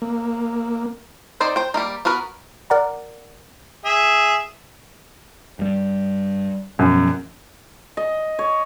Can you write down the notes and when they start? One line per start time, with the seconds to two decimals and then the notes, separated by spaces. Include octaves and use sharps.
0.02 A#3
1.40 C4 D#4 C5 D5
1.56 C5 G5
1.74 G3 A#3 D#4
2.05 B3 F#4 A#4 B4
2.70 A#4 D5 F#5 A#5
3.85 G#4 E5
5.59 G2 G3
6.79 F#2 B2 F3 B3
7.97 D#5
8.39 C#5